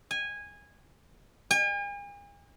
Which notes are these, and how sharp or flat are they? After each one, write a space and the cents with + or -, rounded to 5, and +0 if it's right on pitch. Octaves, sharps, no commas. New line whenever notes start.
G#5 -15
G#5 -45